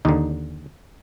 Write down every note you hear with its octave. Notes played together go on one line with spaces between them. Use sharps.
D#2 D3 D#4